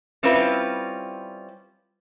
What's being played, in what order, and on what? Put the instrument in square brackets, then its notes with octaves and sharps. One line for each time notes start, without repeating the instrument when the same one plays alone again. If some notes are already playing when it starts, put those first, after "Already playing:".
[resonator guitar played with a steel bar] G3 C4 C#4 E4 F4 B4